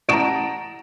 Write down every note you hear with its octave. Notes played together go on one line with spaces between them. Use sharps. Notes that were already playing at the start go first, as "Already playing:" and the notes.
A1 F#5 A5 A#5 C#6 D#6 D7 E7